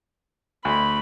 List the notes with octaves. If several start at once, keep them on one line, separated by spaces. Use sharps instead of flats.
D2 B5